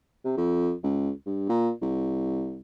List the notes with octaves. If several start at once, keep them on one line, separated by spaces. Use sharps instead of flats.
C3
F2
C#2
G2
A#2
C2